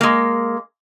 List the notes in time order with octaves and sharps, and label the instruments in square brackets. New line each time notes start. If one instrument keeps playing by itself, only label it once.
[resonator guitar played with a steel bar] G#3 A#3